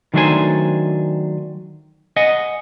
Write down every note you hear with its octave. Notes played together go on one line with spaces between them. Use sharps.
D#3 F#3 A3 D4 C5 G#5
D#5 F#5 G#5